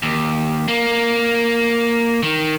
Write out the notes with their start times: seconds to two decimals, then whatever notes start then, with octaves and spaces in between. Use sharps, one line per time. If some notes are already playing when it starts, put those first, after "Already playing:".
0.02 D#2
0.68 A#3
2.23 D#3